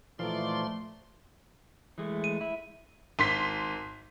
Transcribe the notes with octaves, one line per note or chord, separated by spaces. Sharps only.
A#2 E3 F3 A3 D#4 D5 F5 C6
E3 G#3 A3
D#7
E4
G#1 C6 B6